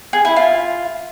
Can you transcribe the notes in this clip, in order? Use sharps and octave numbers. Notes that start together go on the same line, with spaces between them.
G#4
E4
F4